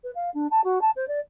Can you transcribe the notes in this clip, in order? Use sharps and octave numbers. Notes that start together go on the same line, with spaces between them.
B4
F5
D4
A5
F#4
A5
C5
D5